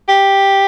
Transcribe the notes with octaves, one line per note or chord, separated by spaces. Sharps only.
G4